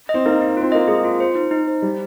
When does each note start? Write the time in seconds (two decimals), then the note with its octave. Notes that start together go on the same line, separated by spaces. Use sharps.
0.09 C4 D#5
0.26 A#3 D#4
0.41 D#4
0.57 C4 F4
0.72 A#3 D#5
0.88 G#3 G#4
1.04 F4
1.20 C5
1.35 D#4
1.51 D#4
1.68 C5
1.82 G3 D5